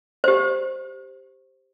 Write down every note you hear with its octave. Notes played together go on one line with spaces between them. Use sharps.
G4 C5